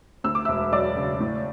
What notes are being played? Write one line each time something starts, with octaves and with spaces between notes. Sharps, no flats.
D2 E6
D6
E1 E5 E6
F#3 D5 D6
C#3
A2